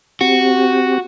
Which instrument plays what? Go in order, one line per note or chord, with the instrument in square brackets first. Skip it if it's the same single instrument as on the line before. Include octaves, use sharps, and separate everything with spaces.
[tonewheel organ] C4 G4 [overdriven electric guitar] F#4